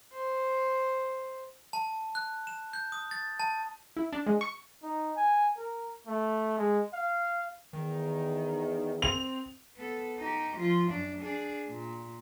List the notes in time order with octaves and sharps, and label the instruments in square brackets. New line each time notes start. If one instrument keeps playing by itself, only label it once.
[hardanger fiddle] C5
[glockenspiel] A5
F#6
E7
G6
D#6
A6
A5
[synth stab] E4
D4
G#3
C#6
[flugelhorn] D#4
G#5
A#4
A3
G#3
F5
[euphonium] E2 [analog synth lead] D#3
[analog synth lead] C4 [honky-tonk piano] F7
[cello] B3 A4
D#4 G4
F3 F4
F#2 D4
D4 G#4
A#2